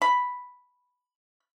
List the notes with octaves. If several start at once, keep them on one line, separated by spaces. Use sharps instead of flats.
B5